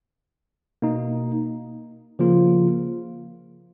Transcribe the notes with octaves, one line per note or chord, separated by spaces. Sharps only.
B2 A#3 D#4
C#3 F3 A#3 F4